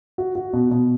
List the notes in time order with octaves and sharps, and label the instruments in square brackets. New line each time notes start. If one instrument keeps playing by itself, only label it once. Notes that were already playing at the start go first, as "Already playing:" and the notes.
[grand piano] F#4
F#4
B2
B2